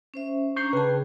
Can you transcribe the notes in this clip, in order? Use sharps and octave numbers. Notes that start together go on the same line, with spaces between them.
C#4 C5 E5
C#4 D4 A#5 C#6 G6 C7
C#3 G#4 B4 G5 A5